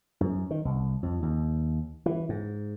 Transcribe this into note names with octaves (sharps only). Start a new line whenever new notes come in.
F#2
D#3
C2
F2
D#2
E3
G#2